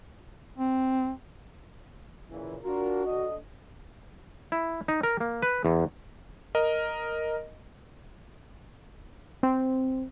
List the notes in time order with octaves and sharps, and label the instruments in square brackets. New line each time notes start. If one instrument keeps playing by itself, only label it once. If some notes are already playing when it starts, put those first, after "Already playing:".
[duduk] C4
[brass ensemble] A#2 C#3 E3
[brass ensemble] D4 F4 A#4 [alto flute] F#4
[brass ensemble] D3 D#5
[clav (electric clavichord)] E4
D#4
A#4
A#3
B4
E2
[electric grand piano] A#4 D#5
[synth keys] C4